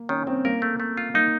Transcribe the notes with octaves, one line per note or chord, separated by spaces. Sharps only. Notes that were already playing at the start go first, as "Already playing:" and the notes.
Already playing: A#3
D#3 C#4
D#3 C4
A#3 A#4
A3
A3
F4
A#3 D#4